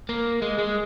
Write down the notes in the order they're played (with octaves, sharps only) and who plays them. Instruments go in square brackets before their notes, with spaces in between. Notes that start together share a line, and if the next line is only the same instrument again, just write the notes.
[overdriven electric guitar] A#3
G#3
G#3